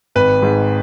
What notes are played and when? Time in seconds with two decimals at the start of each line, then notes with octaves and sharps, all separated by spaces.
0.15 G#1 B4
0.42 G#2